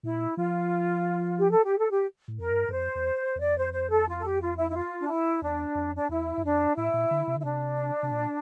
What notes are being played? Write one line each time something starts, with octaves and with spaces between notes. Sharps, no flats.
A#2 E4
F3 F4
G4
A4
G4
A4
G4
A2
F2 A#4
G2
G2
F2 C5
E2
E2
F2 D5
C5
C5
A4
F4
A4
G4
F4
E4
E4
F4
D4
E4
E2 D4
F2
D4
E2 E4
G2
F2 D4
A2 E4
A#2
D3
C3
D3
E4
C3 D4
C3
A#2